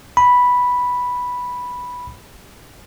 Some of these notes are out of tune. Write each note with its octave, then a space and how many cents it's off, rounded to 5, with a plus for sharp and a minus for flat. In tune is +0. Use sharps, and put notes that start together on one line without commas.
B5 -5